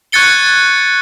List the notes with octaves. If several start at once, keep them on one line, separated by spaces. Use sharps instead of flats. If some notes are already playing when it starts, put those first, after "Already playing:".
C#6 F#6 G#6 A6 C#7 G7